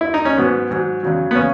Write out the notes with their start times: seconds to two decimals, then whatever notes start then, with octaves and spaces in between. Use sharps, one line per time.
0.01 E4
0.14 D#4
0.25 C#4
0.37 G#2 F#3 B3
0.71 G#2 F#3
1.03 E2 C#3 F#3
1.31 B3
1.35 C#3 C#4